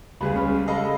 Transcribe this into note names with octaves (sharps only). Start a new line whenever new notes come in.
C#2 G3 G#4 B4 B5
C#4
G#3 A4 D#5 F5 B5